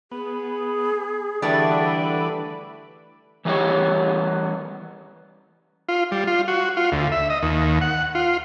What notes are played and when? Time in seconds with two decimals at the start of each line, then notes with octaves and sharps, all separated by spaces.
0.11 B3 G#4
1.42 D3 E3 G3 A3 D4 B4 D5
3.45 E3 G3 B3 G4 C#5
5.89 F4
6.11 G3
6.27 F4
6.48 F#4
6.77 F4
6.92 D2
7.12 E5
7.30 D#5
7.42 D#2
7.81 F#5
8.15 F4